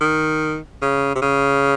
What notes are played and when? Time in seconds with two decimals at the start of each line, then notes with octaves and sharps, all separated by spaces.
0.01 D#3
0.82 C#3
1.15 C3
1.22 C#3